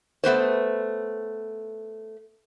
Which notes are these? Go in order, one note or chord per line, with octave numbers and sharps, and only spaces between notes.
A3 B3 B4 C5